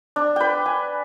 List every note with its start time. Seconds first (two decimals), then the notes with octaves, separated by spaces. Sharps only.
0.16 D4
0.36 B4 G5
0.66 G#5